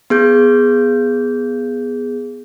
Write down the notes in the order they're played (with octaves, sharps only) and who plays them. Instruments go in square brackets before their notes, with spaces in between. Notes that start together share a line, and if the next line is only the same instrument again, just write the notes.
[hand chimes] B3 G#4 G6